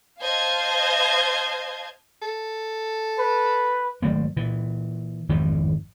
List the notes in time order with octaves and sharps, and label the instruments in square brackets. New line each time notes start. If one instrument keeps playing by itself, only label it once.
[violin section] C5 D#5 F5 A5 G#6
[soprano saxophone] A4
[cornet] B4
[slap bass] G#1 F#3 A3 A#3
A#2 E3
G#1 F2 A2 E3